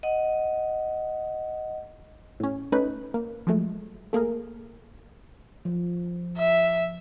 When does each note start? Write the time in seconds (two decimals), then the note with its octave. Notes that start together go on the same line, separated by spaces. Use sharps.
0.03 D#5 F#5
2.40 A2 C#4
2.72 A3 C#4 D#4 B4
3.14 A#3
3.47 F3 F#3 G#3 A3
4.13 A3 A#3 G#4 A#4
5.65 F3
6.37 E5